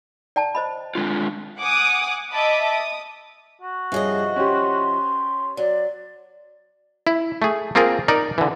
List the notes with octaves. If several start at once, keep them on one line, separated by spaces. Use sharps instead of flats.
D5 G5 A5
C5 D#5 B5
G#3 D4 F4
F#5 G#5 D6 D#6
D#5 E5 A5 B5 D6 D#6
D#6
F#4
G2 C3 F3 G#4 C#5 D#5
C#4 G4 C6
F#3 D5
E4
A3 G#4
A#3 C4 F4 G#4 A#4
D#4 A#4 D5
D3 E3